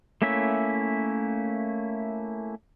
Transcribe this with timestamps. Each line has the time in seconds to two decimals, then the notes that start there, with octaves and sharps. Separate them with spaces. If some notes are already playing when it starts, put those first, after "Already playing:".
0.22 A3 A#3 C#4 E4 E5